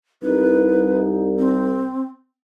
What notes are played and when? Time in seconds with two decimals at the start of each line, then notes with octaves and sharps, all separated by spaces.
0.22 C2 D#4 B4
1.39 C4